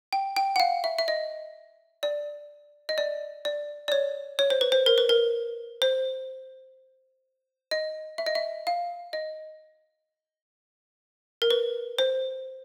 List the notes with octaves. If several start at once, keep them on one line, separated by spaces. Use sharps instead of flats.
G5
G5
F#5
F5
E5
E5
D#5
D5
D#5
D5
D5
D5
C#5
C#5
C5
B4
C5
A#4
B4
A#4
C5
D#5
E5
D#5
E5
F5
D#5
A#4
B4
C5